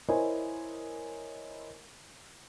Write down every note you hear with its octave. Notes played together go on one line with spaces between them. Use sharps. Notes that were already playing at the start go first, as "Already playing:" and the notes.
E4 A#4 C5 C#5 D#5 G#5